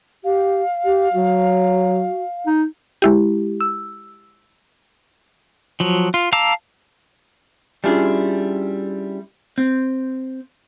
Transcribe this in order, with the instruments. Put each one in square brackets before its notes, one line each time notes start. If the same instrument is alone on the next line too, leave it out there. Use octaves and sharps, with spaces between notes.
[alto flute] G4 [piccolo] F5
[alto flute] G4
[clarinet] F#3 [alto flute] F#4
[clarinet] D#4
[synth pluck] G#3 E4 G4
E6
[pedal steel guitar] F3 F#3
F4
F5 A5 A#5 D6 E6
[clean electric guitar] G3 C#4 D4 E4 F4 G#4
C4